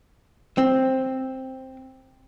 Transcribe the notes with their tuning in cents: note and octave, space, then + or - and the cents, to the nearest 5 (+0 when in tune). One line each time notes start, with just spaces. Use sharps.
C4 +5